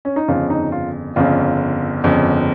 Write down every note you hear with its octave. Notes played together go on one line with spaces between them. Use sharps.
C#4
D#4
G1 F2 C#3 F4
D#4
F4
G1 F2 C#3 F4
G1 F2 C#3